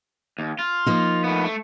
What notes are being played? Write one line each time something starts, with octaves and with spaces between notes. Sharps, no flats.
D#2
F4
F3 A#3 D#4
A3 B3
A3